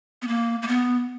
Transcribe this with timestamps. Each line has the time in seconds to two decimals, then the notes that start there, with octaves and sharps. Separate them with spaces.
0.22 B3
0.28 A#3
0.62 A#3
0.68 B3